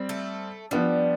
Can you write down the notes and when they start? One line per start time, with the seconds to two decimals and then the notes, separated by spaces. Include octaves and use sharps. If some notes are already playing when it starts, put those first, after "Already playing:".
Already playing: G3 C4
0.09 A3
0.71 F3 G3 B3 D4